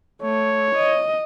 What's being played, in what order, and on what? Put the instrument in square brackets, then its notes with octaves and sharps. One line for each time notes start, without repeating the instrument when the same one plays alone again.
[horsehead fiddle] A3 [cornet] C#5
[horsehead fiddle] D#5